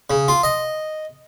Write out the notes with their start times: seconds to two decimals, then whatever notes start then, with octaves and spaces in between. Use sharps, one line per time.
0.10 C#3
0.28 F4
0.43 D#5